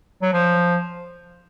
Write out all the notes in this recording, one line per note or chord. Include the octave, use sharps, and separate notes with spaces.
F#3
F3